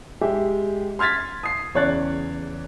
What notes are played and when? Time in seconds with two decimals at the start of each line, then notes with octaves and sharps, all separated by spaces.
0.21 G#3 G4 E5
0.99 C6 F6 G#6 A6 B6
1.43 D#6 C7
1.75 E2 C#3 C#5 D5 F#6 A6